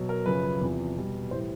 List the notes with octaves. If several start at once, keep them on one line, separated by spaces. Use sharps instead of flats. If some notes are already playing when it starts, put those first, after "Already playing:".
Already playing: B2 F#3
A#4
F#2 C#3 F3 B4
E2 C3 F3
B2 G3
A2 E3 G3 C5